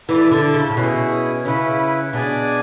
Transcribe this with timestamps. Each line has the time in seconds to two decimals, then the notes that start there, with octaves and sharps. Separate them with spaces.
0.08 E3 E4 A4 D5 A5
0.31 D3
0.54 C#3
0.69 A2
0.77 B2 C#4 E4 G#4
1.45 C#3 C#4 E4 B4
2.13 B2 D4 G#4 D5 G#5